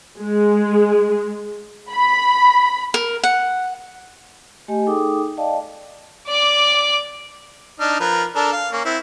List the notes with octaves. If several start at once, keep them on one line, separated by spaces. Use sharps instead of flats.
G#3
B5
A#4
F#5
A3 G4 D#5 G#5
D#4 G#4 A4 G5 D6 D#6
D5 D#5 F5 G5 A5
D5 D6
D4 D#4 F6
F3 A#4 B4
D4 A4 A#4
F5
A#3 C#4
C4 E4